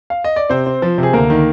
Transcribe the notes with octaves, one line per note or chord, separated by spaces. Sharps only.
F5
D#5
D5
C3 C4 C5
C4
F3
C3
G#4
D2 A#3 A#4
D#3